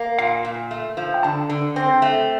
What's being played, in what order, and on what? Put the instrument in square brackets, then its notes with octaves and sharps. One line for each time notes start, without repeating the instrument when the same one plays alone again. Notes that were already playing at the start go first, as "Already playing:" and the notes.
Already playing: [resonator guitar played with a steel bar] A#3
[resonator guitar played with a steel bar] A#2 [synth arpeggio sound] F5
[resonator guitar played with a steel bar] A#2
A3
F3
[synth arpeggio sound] G5
[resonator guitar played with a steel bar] D3 [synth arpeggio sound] A5
[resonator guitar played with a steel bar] D3
C4
A3